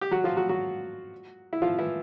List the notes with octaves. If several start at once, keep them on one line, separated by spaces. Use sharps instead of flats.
G4
F#3 F#4
F3 F4
F#3 F#4
F#3 F#4
E4
F3 F4
E3 E4